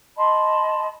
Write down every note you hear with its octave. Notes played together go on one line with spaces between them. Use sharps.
D#5 A5 B5 C6